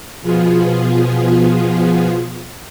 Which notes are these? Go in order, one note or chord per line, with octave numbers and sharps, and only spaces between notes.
B2 F3 B3 F4 G#4